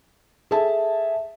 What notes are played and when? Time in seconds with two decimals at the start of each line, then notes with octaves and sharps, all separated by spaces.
0.51 G#4 A4 E5 A5